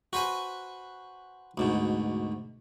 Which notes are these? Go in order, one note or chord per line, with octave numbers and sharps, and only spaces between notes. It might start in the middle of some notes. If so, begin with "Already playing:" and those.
F#4 B4 C5 G#5
D2 G#2 B2